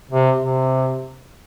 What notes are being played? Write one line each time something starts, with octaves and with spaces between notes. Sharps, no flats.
C3
C3